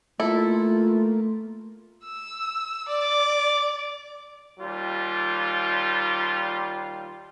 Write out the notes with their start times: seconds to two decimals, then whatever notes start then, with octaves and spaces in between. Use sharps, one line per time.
0.20 A3 A#3 E4 F4 A4
2.04 E6
2.89 D5 D6
4.59 D#2 G3 F4